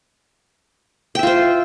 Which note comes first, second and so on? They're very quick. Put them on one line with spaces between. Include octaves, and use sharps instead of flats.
G5 E5 F4 C5